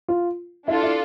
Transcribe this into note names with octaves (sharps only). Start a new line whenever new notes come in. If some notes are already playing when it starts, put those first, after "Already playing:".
F4
D4 E4 F4 A4
E4